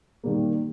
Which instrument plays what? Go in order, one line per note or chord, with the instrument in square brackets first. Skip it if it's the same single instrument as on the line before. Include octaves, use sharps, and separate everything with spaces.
[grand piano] D#3 G3 A#3